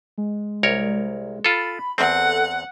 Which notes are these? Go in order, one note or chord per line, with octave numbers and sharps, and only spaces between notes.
G#3
C2 A#4 C#5
F4 A4 B5
E2 C4 A4 F#5